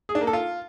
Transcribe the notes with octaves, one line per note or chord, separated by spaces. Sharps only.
G#4
D4
A#3
A4
F4